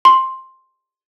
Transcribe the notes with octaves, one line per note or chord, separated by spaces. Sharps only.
C6